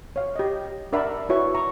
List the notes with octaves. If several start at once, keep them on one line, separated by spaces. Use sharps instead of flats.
C#5 F5
G4 D#5
D4 A#4 D5 E5 F#5 B5
E4 F#4 B4 C#5 E5 C#6
A#5 C#6